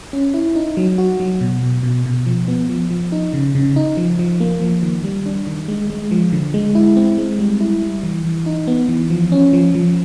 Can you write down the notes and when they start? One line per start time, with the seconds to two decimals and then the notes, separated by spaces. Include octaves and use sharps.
0.13 C#4
0.34 E4
0.56 D#4
0.77 F#3
0.98 F#4
1.20 F#3
1.41 B2
1.63 B2
1.83 B2
2.06 B2
2.26 F3
2.48 B3
2.69 F3
2.91 F3
3.12 D#4
3.33 C#3
3.55 C#3
3.76 D#4
3.97 F3
4.19 F3
4.40 A#3
4.62 F3
4.83 D#3
5.04 G3
5.26 D4
5.47 D#3
5.68 G#3
5.90 G#3
6.11 F3
6.32 D3
6.54 G#3
6.75 E4
6.96 C4
7.18 G#3
7.39 G3
7.61 E4
7.82 G3
8.03 E3
8.25 E3
8.46 D#4
8.68 B3
8.89 E3
9.10 F3
9.32 C#4
9.53 F3
9.75 F3